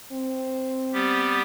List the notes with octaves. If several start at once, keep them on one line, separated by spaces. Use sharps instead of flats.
C4
G3 B3 G4